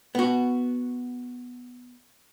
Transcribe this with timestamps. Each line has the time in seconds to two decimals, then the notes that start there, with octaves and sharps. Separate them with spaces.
0.15 B3 F#4